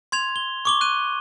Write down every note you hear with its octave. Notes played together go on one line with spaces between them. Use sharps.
C6 G#6 F7
G7
C#6 D6 G7
F#6 D#7